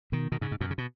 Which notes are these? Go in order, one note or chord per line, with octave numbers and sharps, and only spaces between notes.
B2 D#3
B2 D#3
G#2 C#3
G#2
F#2 B2
C#3
B2